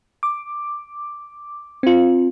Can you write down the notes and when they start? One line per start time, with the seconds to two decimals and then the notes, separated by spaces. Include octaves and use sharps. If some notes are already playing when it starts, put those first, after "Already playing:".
0.23 D6
1.83 C4 F4